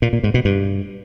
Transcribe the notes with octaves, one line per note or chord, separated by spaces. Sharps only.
A#2
A#2
G#2
B2
G2